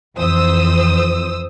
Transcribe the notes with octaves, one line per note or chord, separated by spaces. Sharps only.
F2 E3 C5 D#6 E6